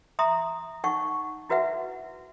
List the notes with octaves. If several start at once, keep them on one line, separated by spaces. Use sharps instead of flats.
E5 A#5 C6 D#6
D#4 F#5 C#6
E4 F#4 B4 E5 F#5